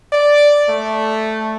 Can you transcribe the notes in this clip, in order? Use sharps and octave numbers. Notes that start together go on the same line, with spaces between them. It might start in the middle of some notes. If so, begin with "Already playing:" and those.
D5
A3